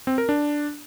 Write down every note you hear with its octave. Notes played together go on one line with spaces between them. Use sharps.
C4
A#4
D4